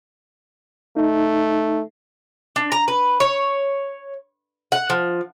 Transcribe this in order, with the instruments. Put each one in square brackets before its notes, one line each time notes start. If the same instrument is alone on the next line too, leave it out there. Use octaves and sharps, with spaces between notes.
[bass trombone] A3 [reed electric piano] D#4
[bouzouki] D4
A#5
B4
C#5
F#5
F3